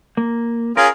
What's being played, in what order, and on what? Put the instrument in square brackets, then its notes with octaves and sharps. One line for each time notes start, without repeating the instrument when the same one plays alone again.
[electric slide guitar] A#3
[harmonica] C#4 F4 G#4 [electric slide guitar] A#4